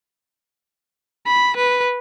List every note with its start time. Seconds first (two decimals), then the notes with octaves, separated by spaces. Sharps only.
1.27 B5
1.57 B4